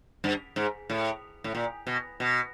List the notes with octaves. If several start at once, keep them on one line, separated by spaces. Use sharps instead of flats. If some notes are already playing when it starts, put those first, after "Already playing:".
G2
G#2
A2
A2
A#2
B2
B2